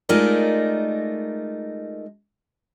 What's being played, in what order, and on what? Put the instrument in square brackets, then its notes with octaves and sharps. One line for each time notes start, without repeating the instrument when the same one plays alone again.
[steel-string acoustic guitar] G#3 A3 D#4 F4 A#4 D5